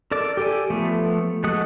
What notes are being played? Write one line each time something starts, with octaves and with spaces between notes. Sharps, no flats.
A4 A#4 D5 D6
G4 A4 G#5
F3 A3 B3
G#3 A3 F#4 F#5 D#6